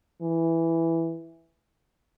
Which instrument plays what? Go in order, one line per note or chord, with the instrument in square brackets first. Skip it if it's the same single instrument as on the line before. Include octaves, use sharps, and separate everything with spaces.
[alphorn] E3